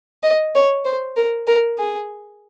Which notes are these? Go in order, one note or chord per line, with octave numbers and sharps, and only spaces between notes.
D#5
C#5
C5
A#4
A#4
G#4